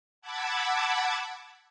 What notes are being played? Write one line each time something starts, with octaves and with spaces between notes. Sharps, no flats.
F#5 A5 B5 D6 E6 G#6